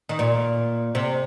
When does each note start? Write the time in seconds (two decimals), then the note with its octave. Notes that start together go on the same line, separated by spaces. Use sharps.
0.09 D#3
0.19 A#2
0.95 C3